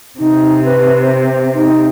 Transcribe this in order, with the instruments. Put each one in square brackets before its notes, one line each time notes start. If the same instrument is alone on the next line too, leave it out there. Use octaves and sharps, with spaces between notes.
[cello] C3 [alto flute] D#4
[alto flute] B4
C5
D#4